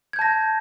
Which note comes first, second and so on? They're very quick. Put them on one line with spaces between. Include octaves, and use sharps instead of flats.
G#6 G6 A5 A#6